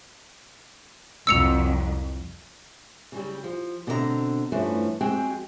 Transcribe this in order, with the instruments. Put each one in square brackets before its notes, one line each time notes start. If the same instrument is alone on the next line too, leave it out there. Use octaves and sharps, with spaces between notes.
[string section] C2 F2 F#3 [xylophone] E6 C#7 F7
[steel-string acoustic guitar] C#3 F#3 G3
F3
B2 D3 C4 D5 A#5
E2 G2 F3 A3 C#4 B4
F2 G#3 C4 F#4 G#4 G5